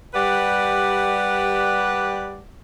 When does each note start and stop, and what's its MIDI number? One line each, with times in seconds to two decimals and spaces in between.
0.14 2.41 55
0.14 2.41 67
0.14 2.41 71
0.14 2.41 74
0.14 2.41 78